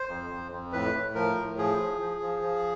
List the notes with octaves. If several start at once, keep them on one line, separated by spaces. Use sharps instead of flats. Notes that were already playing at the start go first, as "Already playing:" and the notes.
Already playing: C5
F2
F2
F2
A2 B4
A2
F3 A#4
A2
F3 G#4
F3
F3
F3
F3